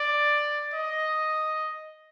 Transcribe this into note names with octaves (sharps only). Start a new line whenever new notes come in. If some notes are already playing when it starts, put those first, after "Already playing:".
Already playing: D5
D#5